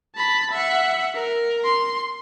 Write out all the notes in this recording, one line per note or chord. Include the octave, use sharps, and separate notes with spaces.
A5 B5
E5 F#5
A#4
C6